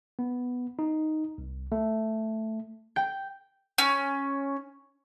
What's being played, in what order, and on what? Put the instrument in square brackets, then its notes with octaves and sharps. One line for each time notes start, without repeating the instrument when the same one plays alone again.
[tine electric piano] B3
D#4
C2
A3
[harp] G5
[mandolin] C#4